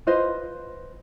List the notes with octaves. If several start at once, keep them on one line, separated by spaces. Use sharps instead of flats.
F4 B4 C5 D#5